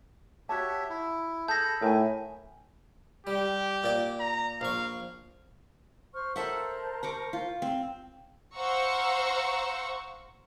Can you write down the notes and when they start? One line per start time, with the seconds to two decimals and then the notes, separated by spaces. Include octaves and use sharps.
0.49 F#4 G4 C#5 E5 A5
0.90 E4
1.48 G#4 A4 A5 B5 G6 A#6
1.82 A2 D#4 A#4 E5 G#5
3.27 G3 G4
3.84 A#2 D5
4.20 A#5
4.61 A#1 F5 C#6
6.14 C5 C#6 F6
6.36 A4 A#4 C5 E5 F#5 A5
7.03 A#5 C#6 D6
7.33 F4
7.62 C4
8.57 C5 F5 F#5 A#5 C#6 E6